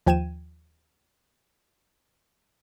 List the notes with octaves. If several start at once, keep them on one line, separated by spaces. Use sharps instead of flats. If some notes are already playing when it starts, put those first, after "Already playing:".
D#2 F3 G5 G#6 D#7 E7